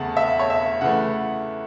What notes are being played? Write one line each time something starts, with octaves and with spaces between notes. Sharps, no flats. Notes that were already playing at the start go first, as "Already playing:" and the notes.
Already playing: E2 C#3 A3 F#5 A5
E5
C#5
E5
C#3 E3 A3 F#5